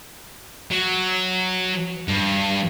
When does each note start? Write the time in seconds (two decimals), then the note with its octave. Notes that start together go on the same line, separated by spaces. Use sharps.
0.71 F#3
2.08 G2